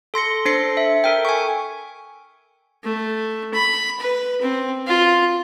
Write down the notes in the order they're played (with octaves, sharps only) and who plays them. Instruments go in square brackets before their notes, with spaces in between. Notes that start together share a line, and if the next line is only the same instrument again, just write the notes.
[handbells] A4 C6 A#6 C#7
D4 A4 C5 A#6 C7 C#7
E5
A4 A#4 G5
G#5 C#6
[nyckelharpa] A3
B5
B4
C4
F4